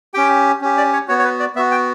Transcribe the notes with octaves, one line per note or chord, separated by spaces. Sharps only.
C#4 G4 G5
C#4 G4
D5
C#5
B3 F#4 C#5
C#5
B4
D5
B3 F#4 E5
G5